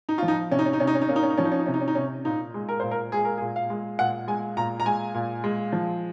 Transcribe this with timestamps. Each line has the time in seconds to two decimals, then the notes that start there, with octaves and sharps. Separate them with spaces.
0.09 D#4
0.18 F3 F4
0.28 D#4
0.51 C3 C#4
0.59 D#4
0.66 C#4
0.73 D#4
0.80 C3 C#4
0.87 D#4
0.95 C#4
1.02 D#4
1.09 A#3 C#4
1.16 D#4
1.23 C#4
1.30 D#4
1.37 F3 C#4
1.45 D#4
1.52 C#4
1.59 D#4
1.66 C3 C#4
1.74 D#4
1.81 C#4
1.88 D#4
1.95 C3 C#4
2.25 A#2 D#4
2.54 G#3
2.69 A#4
2.80 A#2 C5
2.91 A#4
3.12 G#3 G#4
3.25 A#4
3.38 G#4
3.41 A#2
3.56 F5
3.70 G#3
3.99 A#2 F#5
4.28 G#3 G#5
4.57 A#2 A#5
4.80 A#5
4.85 G#3 G#5
5.15 A#2
5.44 G#3
5.73 F3